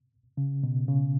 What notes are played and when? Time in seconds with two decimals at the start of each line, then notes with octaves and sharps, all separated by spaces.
0.37 C#3
0.63 B2
0.88 C#3